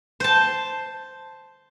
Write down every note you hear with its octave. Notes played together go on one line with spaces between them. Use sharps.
C5 A5